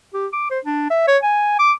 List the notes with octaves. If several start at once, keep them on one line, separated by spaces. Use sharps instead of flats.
G4
D6
C5
D4
E5
C#5
G#5
D6